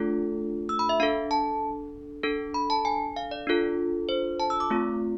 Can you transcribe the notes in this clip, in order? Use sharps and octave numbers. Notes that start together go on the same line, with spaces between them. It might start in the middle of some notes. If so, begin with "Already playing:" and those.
Already playing: A3 D4 F4 A4
E6
B5
E5
D4 A4 F5
A5
D4 A4
B5
A5
G#5
F5
D5
D4 F4 A4
C5
A5
E6
D6
A3 C4 F4